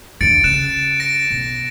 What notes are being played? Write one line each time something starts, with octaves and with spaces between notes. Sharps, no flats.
D#2 D3 A6 C#7 D7
C#3 F#6 E7
A#6 D7
B1